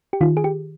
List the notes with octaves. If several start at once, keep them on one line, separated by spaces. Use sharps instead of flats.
G4
D#3 F4
G#4
G4